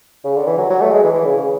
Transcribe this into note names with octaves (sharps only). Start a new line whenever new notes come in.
C#3
D3
E3
F#3
F#3
A3
G#3
E3
E3
C#3
C#3